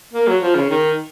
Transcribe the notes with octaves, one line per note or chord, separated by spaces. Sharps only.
A#3
F#3
F3
C#3
D#3